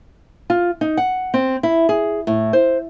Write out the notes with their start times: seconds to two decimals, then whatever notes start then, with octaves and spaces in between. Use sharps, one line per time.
0.50 F4
0.81 D#4
0.97 F#5
1.34 C4
1.63 E4
1.89 G#4
2.27 A2
2.53 C5